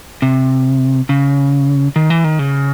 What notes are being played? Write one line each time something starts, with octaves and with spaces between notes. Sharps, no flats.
C3
C#3
D#3
E3
D#3
C#3